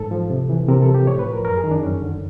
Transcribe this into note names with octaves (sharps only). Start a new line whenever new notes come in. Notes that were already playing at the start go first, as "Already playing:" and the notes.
Already playing: G#2 A4
F3
C3
E3
C3 A#4
A4
F3
G4
A2 C#5
B4
F3
A#4
F#2 A#4
G#4
D#3
D4
F#2 C#4
D3